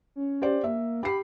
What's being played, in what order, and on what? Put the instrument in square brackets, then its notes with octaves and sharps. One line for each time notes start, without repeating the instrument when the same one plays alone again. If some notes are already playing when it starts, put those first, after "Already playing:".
[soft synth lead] C#4
[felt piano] G4 C5 D5
[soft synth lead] A#3 [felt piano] E5
[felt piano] G4 C7 [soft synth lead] B5